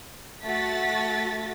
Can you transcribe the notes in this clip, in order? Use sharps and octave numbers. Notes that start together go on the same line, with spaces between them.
A3 F#4 A6 B6